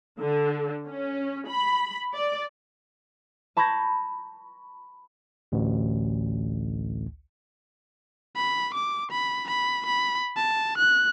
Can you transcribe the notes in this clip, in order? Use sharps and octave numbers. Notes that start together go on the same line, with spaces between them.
D3
C#4
B5
D5
A5 B5 C#6 G6 G#6 A#6
A1 D2
B5
D6
B5
B5
B5
A5
F#6